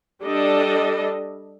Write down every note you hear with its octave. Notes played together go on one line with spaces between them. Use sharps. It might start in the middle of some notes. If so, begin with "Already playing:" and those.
G3 D4 A4 D#5